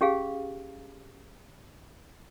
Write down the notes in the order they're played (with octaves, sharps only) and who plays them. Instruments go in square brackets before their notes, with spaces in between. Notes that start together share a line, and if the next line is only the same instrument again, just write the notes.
[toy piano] C#4 G4 G#4 F5